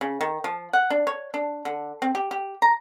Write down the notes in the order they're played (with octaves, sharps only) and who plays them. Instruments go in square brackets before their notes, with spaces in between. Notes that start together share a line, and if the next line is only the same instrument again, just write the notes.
[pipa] C#3
D#3
F3
F#5
D4
C#5
D4
D3
C4
G4
G4
A#5